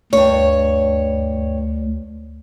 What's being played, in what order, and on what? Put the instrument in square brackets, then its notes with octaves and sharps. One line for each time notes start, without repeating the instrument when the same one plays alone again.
[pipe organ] D2 [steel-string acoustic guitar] G2 C#5